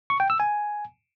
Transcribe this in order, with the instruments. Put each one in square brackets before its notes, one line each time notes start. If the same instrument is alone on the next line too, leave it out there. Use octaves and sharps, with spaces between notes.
[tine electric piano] C#6
G5
E6
G#5